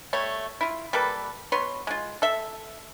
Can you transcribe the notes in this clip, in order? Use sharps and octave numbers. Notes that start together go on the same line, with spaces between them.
G3 A3 C#5
E4 F4
G3 A#3 A4 B4
B2 B4 C#5 C6
G#3 F4
A4 E5